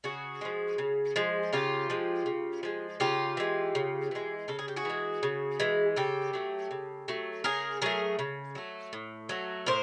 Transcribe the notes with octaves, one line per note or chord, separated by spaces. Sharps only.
C#3 F#4 G#4
F3 G#3
C#3
F3 G#3
C#3 F4 G4
F3 G#3
C#3
F3 G#3
C#3 F4 G4
E3 G#3
C#3
E3 G#3
C#3 A4
G#4
G4
F#4 G#4
E3 G#3
C#3
E3 G#3
C#3 G4 A4
F#3 A3
C#3
F#3 A3
C#3 G#4 A#4
F#3 A3 G#4 A#4
C#3
F#3 A3
A2
F#3 A3
A2 A#4 C5